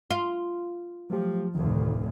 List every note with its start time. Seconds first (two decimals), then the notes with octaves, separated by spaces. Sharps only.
0.11 F4
1.10 F3 F#3 A3 G4
1.55 F1 D2 A2 D#3